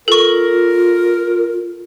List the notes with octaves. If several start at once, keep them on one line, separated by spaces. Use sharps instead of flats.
F4 A4 A#4 C#6